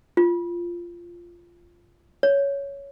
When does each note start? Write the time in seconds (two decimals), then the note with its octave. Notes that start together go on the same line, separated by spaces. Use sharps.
0.17 F4
2.23 C#5